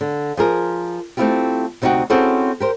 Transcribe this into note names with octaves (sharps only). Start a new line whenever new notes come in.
D3
F3 G#4 A#4
A3 C4 D4 E4 F4 G4
D2 C3 D#4 E4 F#4 G5
C4 C#4 E4 F#4 G#4 A4
G4 A#4 C5